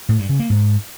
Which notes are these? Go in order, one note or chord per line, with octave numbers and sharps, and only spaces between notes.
A2
G2
C#3
A#3
G#2